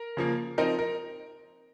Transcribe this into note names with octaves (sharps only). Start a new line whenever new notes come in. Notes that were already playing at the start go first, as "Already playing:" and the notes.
Already playing: A#4
C#3 F3 A#3
F3 C4 D#4 A#4
A#4